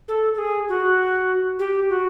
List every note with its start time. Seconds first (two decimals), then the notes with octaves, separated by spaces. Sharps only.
0.08 A4
0.34 A4
0.38 G#4
0.69 F#4
1.59 G4
1.89 F#4